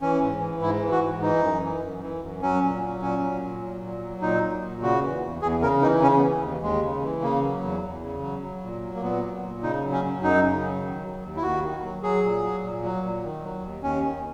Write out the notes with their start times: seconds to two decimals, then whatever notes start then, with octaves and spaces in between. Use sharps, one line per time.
0.02 E3 C#4
0.21 G#2
0.41 E3
0.61 G#2 E4
0.82 E3
0.91 F#4
1.02 G#2
1.22 E3 D#4
1.42 F#2
1.62 E3
1.82 F#2
2.01 E3
2.22 F#2
2.42 F#3 C#4
2.62 A#2
2.82 F#3
3.01 A#2 C#4
3.22 F#3
3.42 A#2
3.61 F#3
3.82 A#2
4.02 F#3
4.22 A#2 D#4
4.43 F#3
4.62 A#2
4.82 C#3 F#4
5.02 E3
5.22 E2
5.42 E2 G#4
5.62 C#3 A#4
5.81 E3 D#4
6.02 C#3 C#4
6.17 B3
6.22 E3
6.42 D#2
6.62 D#2 G#3
6.83 C#3
7.02 E3
7.22 C#3 A#3
7.43 F#3
7.62 E2
7.83 E2
8.03 C#3
8.22 F#3
8.42 F#3
8.63 A#2
8.83 F#3
8.95 A#3
9.02 A#2 B3
9.23 F#3
9.43 A#2
9.63 C#3 D#4
9.83 F#3
9.92 C#4
10.03 F#2
10.22 F#2 D#4
10.43 C#3
10.63 F#3
10.83 D#3
11.03 F#3
11.23 D#2
11.37 E4
11.42 D#2 F#4
11.63 D#3
11.83 F#3
12.02 F#3 G#4
12.23 A#2
12.43 F#3
12.63 A#2
12.83 F#3
13.03 A#2
13.23 D#3
13.43 F#3
13.64 D#2
13.83 D#2 C#4
14.03 D#3